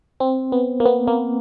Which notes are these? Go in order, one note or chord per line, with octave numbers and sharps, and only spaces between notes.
C4
B3
A#3
B3
A#3